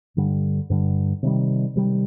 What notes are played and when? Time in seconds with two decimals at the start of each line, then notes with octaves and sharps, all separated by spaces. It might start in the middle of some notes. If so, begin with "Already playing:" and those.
0.16 G2 D3 G3
0.70 G2 D3 G3
1.23 C3 D#3 G3
1.75 C3 D#3 G3